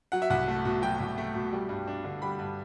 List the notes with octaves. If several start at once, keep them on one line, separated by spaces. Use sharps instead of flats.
F#3 F#5
E5
C2 F#5
A3
B2
F#3 G5
C2
A3
B2
G3
G2
D4
D3
G3 B5
G2